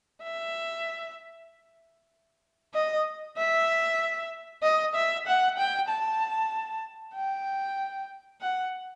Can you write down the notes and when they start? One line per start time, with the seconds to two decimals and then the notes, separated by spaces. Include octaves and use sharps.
0.23 E5
2.74 D#5
3.37 E5
4.63 D#5
4.95 E5
5.27 F#5
5.57 G5
5.89 A5
7.15 G5
8.41 F#5